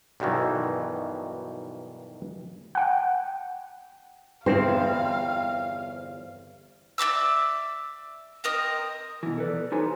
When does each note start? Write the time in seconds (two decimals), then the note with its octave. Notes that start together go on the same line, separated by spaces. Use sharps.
0.20 B1 G2 B2 D#3 E3
2.75 F#5 G5
4.46 G1 E2 C4 C5 F5
6.98 D5 E5 D6 E6
8.44 C4 A#4 D#5 D#6
9.23 B2 E3
9.38 A4 B4 D5
9.72 D#4 G4 A4 C5 C#5 G#5